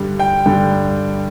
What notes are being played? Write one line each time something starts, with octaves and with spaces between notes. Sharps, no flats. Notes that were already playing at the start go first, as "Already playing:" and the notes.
Already playing: G2 D3 G3
G5
G2 D3 G3